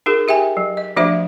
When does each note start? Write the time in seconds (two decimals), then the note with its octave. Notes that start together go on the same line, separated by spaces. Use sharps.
0.06 D#4 F#4 G#4 A#4
0.28 G4 E5 G5 G#5
0.57 F#3
0.77 D#5
0.96 F3 A3 D4 F#4 C5 E5